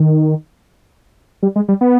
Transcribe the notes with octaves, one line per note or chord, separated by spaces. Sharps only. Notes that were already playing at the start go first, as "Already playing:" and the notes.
Already playing: D#3
G3
G#3
G3
B3